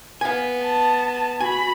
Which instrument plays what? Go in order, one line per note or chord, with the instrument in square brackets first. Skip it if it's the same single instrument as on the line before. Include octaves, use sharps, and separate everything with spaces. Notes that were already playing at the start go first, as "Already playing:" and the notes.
[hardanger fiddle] B3 [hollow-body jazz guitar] F5 G#5
[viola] A5
[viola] F#4 B5 [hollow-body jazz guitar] G#5